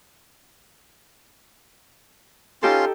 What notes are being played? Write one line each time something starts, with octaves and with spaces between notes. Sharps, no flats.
C#4 D#4 F4 G4 A4 C6